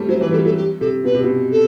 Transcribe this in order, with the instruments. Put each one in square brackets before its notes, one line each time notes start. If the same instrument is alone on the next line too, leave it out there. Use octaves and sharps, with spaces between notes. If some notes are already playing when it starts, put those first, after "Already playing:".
Already playing: [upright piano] G3 A3 C4
[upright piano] F#3 [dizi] C5
[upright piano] E3 [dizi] B4
[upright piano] G3 [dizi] A4
[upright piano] F#3 [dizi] A4
[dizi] G4
[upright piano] C3 [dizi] A4
[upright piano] B2 [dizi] B4
[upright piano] C3
B2
[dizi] A4